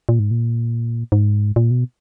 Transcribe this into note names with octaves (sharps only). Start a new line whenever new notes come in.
A#2
G#2
A#2
G#2
A#2
B2